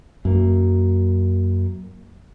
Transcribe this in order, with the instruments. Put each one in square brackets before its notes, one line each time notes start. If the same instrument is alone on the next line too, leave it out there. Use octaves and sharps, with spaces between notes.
[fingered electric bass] F#2 A#3